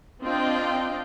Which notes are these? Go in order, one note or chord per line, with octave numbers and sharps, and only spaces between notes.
C4 D4 F4 D#5 G5